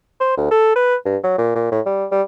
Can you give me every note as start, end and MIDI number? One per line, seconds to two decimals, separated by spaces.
0.20 0.36 72
0.37 0.49 38
0.51 0.74 69
0.76 0.95 71
1.06 1.17 43
1.24 1.36 54
1.38 1.51 46
1.55 1.68 46
1.72 1.81 45
1.86 2.05 55
2.11 2.22 55